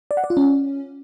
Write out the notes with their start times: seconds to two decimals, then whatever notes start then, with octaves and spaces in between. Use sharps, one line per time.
0.11 D5
0.17 F#5
0.24 D5
0.30 F4
0.37 C#4